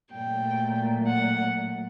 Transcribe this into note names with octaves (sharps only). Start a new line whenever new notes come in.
A#2 F#3 A3 G5
F#5